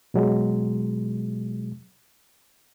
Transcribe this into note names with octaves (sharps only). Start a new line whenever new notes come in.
B2 F#3 G#3